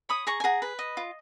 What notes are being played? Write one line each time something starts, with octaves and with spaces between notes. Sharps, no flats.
C#5 B5 D#6
G#4 A#5 C#6
G#5
G#4 F#5 A#5
B4
D#5
F4